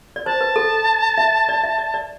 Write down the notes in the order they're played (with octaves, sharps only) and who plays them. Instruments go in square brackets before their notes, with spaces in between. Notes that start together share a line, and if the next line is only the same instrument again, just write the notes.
[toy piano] D5
[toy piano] C5 [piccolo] A5
[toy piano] B4
A4
E5
D5
E5
D5
D5